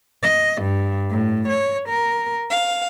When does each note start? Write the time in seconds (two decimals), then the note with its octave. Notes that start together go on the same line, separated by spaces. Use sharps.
0.21 D#5
0.61 G2
1.10 A2
1.47 C#5
1.88 A#4
2.50 F5